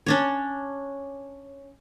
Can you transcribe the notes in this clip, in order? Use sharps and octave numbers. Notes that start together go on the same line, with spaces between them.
C#4 D4 C#5